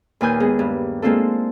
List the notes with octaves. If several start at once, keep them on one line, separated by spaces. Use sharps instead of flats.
D#2 A#2 B4 G#5 D#6 G6
G#3 B3 G#4
G2
G#3 A#3 C4 D4 F4 A4